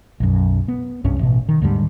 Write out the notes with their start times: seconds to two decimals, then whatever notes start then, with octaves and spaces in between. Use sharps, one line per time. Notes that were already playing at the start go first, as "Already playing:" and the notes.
0.20 B1 F#2
0.68 B3
1.05 C2 G2 C#4
1.20 A1 B2
1.49 D#3
1.62 D#2 G#2 D3 G3